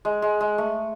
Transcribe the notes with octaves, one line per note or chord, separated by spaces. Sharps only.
G#3
G#3
G#3
A3